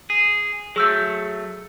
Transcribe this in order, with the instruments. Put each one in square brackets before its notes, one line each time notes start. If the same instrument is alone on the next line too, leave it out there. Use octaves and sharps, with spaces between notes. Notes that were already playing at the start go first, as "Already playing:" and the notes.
[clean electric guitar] G#4
[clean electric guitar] F#3 A3 [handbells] G#4 E6 G6